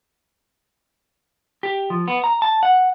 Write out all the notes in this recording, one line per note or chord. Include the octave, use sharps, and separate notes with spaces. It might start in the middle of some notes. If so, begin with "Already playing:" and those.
G4
F3
B3
A#5
A5
F#5